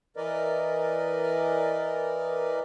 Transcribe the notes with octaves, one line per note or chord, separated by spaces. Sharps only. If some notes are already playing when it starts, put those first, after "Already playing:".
E3 A#4 B4 D5 D#5